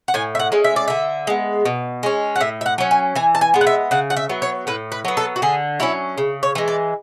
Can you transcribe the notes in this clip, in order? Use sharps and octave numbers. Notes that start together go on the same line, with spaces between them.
F#5
A2 G#5
E5
F#5
G#3 C#4
E5
D5
D3 E5
G#3 B3
B2
G#3 C#4
F#5
A2 E5
E5
F#5
F#3 C#4
G#5
E3 G#5
A5
G#5
G#3 B3
F#5
E5
C#3 F#5
F#5
E5
F#3 B3
C#5
A2 B4
B4
F#3 B3
A4
F#4
D3 G#4
F#3 C#4 E4
C#3
C#5
E3 G#3
D5